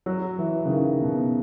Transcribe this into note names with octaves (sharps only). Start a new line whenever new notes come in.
F#3
E3
C#3
D#3
B2